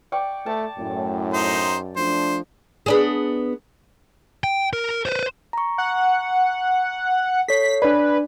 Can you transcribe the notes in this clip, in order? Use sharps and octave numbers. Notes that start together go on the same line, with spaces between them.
D5 G5 C#6
A3 A5
F#2 A2
D#4 C5
F3 A3 D4 C5
B3 D4 G#4
G5
A#4
B4 C5
A#5 C#6
F#5
A4 C#5 B6 C7
D4 B4 D5